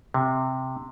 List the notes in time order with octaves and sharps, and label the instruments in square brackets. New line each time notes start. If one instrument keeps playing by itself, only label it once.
[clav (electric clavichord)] C3